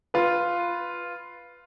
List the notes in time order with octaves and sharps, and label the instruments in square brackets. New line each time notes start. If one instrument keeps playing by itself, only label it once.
[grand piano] F4 B4